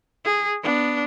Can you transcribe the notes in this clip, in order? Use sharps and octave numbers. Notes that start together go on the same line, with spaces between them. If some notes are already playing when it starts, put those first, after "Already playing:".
G#4
B3 D4